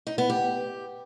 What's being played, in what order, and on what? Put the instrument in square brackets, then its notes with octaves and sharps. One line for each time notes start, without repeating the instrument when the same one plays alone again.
[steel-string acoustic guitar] D#4
B3
G4